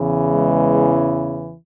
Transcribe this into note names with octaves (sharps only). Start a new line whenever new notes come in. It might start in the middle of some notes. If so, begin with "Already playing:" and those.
Already playing: E2 C#3 E3
G#3